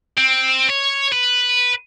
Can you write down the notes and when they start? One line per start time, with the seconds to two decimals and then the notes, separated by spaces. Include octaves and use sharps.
0.18 C4
0.70 C#5
1.12 B4